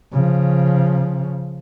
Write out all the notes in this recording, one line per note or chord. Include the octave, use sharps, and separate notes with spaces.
C#3 F3